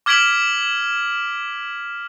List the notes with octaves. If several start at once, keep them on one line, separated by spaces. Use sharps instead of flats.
D6 F6 G#6 B6 D7 F#7